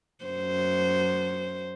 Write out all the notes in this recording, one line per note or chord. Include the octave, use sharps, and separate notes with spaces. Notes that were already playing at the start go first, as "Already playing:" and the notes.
F#2 C5